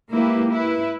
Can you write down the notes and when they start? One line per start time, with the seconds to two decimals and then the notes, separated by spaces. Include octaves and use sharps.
0.11 G#3 A#3 E4 G4 B4
0.50 E4 B4